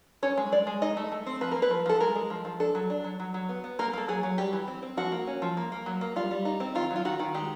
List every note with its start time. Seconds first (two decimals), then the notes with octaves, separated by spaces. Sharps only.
0.23 C#4 C#5
0.37 G#3
0.52 G#3 D5
0.67 G#3
0.82 D#4 D#5
0.97 A3
1.12 A3
1.26 C4
1.41 F3 B4
1.52 A#3 A#4
1.62 B4
1.71 F3
1.86 F3 A4
2.00 G#3 A#4
2.15 G#3
2.30 F3
2.45 F3
2.60 D4 A4
2.75 F#3
2.90 D4
3.04 F#3
3.20 F#3
3.34 F#3
3.49 B3
3.64 B3
3.79 A#3 A#4
3.93 A#3 A4
4.08 F#3 G#4
4.23 F#3
4.38 G3 G4
4.53 E3
4.68 C4
4.82 C4
4.97 F3 F#4
5.12 A#3
5.27 C#4
5.42 F3
5.57 A#3
5.72 A#3
5.86 F#3
6.01 A#3
6.16 G3 F4
6.31 G3
6.45 D#4
6.60 C4
6.75 D#3 F4
6.91 F#3
6.96 F4
7.05 D#3 F#4
7.20 D#3
7.35 G#3 G4